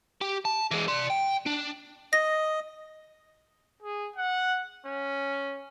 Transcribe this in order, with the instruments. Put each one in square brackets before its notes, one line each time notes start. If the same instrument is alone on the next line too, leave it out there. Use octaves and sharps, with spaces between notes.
[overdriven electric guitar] G4
A5
E3 G#3
D5 C6
G5
D4
[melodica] D#5 [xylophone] A#6
[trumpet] G#4
F#5
C#4